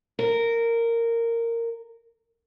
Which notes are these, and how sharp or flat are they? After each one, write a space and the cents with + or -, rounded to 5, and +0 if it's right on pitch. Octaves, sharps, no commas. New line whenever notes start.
A#4 -15